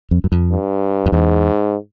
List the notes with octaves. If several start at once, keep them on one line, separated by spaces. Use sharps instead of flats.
F2
F#2
F2
G2
F2
E2 G#2